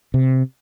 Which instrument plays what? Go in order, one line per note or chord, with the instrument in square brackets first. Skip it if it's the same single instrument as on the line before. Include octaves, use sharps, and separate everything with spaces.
[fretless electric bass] C3